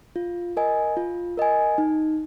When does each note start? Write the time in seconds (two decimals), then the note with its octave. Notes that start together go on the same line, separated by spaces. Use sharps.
0.16 F4
0.57 A#4 D#5 G#5
0.97 F4
1.37 A#4 D#5 G#5
1.78 D#4